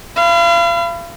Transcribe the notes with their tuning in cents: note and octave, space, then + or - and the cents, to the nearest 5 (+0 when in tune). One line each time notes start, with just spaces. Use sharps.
F5 -40 B5 +20